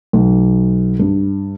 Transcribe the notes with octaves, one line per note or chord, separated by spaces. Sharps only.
B1
G2